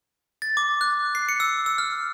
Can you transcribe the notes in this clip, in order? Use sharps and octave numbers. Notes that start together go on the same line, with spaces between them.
A6
D6
F#6
C7
C#7
E6
E6
F6